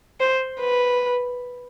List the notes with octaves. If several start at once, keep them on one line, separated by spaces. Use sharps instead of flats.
C5
B4